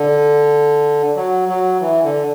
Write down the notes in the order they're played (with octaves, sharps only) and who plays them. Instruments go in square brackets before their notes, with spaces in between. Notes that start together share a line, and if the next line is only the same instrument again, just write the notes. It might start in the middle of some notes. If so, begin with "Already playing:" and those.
Already playing: [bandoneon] D3
F#3
F#3
E3
D3